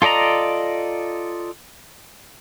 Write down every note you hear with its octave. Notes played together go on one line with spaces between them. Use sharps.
F4 A4 D5 D#5 A#5